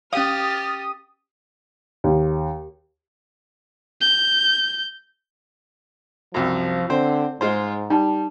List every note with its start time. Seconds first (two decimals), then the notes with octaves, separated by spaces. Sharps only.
0.13 C#4 G4 F5 D#6 F6 A6
2.04 D#2
4.01 G6
6.34 C2 F#2 F3
6.90 D3 C4 C5
7.41 G#2 G#3 F4 C5
7.90 G3 D#4 A5